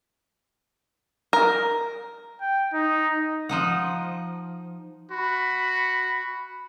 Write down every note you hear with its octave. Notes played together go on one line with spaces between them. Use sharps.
A#4
G5
D#4
F3 D#4 F#5
F#4 B5